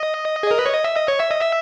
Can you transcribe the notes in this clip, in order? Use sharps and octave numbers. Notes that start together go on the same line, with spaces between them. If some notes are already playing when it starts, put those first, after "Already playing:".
Already playing: D#5
G#4
A#4
B4
C#5
D#5
E5
D#5
C#5
E5
D#5
E5